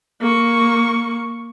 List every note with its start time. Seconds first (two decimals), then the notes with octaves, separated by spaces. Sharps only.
0.21 A#3 C#6